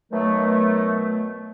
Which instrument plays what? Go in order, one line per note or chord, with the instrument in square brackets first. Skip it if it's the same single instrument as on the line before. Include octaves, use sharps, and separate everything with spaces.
[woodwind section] B2 D#3 F#3 A3